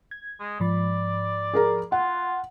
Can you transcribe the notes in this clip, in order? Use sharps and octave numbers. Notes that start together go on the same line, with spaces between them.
G#6
G#3
G#2 F3 D5 B5
G#4 A#4 A#5
F4 F#5